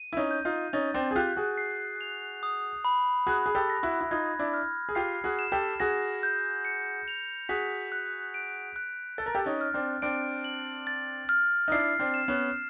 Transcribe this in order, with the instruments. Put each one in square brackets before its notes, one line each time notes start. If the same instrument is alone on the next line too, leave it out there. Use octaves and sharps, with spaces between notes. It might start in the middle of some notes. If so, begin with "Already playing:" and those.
Already playing: [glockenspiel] D#7
[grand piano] E4
C#4 D#4
[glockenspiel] G6
[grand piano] D#4 F4
[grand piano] C#4 D#4 [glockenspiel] A6
[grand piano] C4 D4
G#4
[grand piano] F4 G4 [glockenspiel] F#6
[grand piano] F#4 G#4
[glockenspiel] C7
F7
D#6
B5
[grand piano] F#4 G#4 [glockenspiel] F#6
[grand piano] G#4
G4 A4
[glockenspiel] A#6
[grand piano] E4 F#4
E4
[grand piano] D#4 F4 [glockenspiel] G#6
[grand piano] D4 E4
[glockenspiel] F6
[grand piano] G#4
[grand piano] F4 G4 [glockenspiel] C7
[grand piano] F#4 G#4
[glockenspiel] E7
[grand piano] G4 A4
[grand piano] F#4 G#4 [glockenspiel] A#6
[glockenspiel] G6
C#7
F7
[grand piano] F#4 G#4 [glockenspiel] B6
[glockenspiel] F#6
D7
F#6
[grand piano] A4 [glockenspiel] A6
[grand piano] A#4
G4 A4
C#4 D#4
[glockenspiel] F6
[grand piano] C4 D4
[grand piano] C4 D4 [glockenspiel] D7
[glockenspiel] F#7
A6
F6
[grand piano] D#4
[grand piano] D4 E4 [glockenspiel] C7
[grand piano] C4 D4
[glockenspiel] E7
[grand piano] B3 C#4